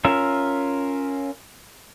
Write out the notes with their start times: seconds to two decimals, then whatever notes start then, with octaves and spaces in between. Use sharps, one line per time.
0.05 C#4 F4 A#4 E5